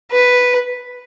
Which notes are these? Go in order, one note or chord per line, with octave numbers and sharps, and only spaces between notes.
B4